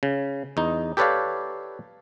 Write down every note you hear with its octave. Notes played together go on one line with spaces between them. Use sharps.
C#3
E2 D#4
G4 A4 B4 C#5 D5 F5